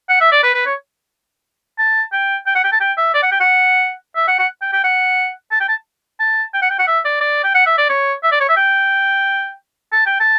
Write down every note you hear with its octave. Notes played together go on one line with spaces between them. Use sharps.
F#5
E5
D5
B4
B4
C#5
A5
G5
G5
F#5
G5
A5
G5
E5
D5
F#5
G5
F#5
E5
F#5
F#5
G5
G5
F#5
A5
G5
A5
A5
G5
F#5
G5
F#5
E5
D5
D5
G5
F#5
E5
D5
C#5
E5
D5
C#5
E5
G5
A5
G5
A5